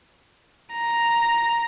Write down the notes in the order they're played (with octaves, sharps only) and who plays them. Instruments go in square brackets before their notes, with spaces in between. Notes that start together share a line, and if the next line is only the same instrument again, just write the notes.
[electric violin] A#5